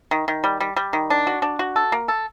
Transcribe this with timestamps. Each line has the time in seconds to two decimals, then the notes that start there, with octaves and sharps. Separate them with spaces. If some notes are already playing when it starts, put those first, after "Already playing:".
0.11 D#3
0.28 D#3
0.44 G3
0.60 G3
0.76 G3
0.93 D#3
1.10 D4
1.27 F#4
1.42 D4
1.59 F#4
1.76 A4
1.92 A#3
2.08 A4